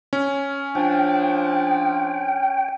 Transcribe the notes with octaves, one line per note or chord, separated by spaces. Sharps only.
C#4
F3 D4 G5